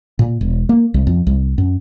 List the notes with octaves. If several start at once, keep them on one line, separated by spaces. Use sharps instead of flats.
A#2
E1
A#3
C2
F2
C2
F#2